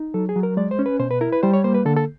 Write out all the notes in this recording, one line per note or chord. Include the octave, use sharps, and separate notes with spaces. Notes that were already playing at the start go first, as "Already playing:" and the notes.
Already playing: D#4
F#3 A4
G#4
F#3
A#4
G#3 D5
C5
C#4
B4
B2 C5
B4
E4 A#4
B4
G3 C5
C#5
A#3 C5
B4
D3 A4
A4